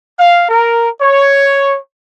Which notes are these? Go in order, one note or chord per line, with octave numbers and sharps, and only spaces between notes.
F5
A#4
C#5